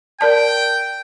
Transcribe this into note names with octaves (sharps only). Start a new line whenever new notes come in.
A#4 D5 G5 A5